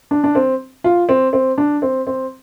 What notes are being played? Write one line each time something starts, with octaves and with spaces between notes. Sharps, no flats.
D4
D4
C4
F4
C4
C4
D4
C4
C4